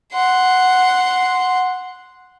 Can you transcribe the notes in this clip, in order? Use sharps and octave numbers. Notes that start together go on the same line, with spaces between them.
F#5 C6